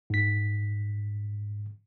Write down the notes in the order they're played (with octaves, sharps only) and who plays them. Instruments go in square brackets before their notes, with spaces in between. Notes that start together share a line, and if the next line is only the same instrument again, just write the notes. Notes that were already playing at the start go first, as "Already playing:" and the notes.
[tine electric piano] G#2 B6